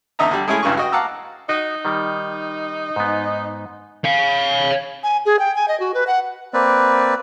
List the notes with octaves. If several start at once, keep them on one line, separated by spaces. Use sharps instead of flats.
E2 D3 D#4 D#5 E5 A#5
D3 G3
G#3 A3 C#4 E4 G#4
B1 G2 C#3 E3 C#4 C#6
F#4 D#5 G5
F5 F#5 A5 A#5 D6 E6
D#4 F#4
D#3 G3
G#2 B3
C#5 F5
G#5
G#4
G5
G#5
D#5
F#4
B4
F#5
A#3 C4 B4 D5